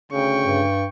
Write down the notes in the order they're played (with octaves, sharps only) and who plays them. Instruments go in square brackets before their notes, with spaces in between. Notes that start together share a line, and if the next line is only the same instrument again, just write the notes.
[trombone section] D2 C#3 [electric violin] G5 C#6
[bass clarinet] G2